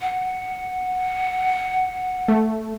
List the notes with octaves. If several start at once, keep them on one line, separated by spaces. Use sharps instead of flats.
F#5
A3